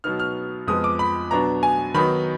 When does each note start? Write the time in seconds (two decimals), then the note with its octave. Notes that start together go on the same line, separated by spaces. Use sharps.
0.04 B2 F#3 B3 D#4 F6
0.20 F6
0.67 F2 F3 G#3 B3 D#6
0.84 D6
0.99 B5
1.31 B2 F#3 B3 D4 A#5
1.63 G#5
1.94 D#3 F#3 B3 D#4 B5